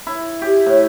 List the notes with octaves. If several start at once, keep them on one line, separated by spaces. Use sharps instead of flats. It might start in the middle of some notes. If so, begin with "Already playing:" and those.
E4
G4
A2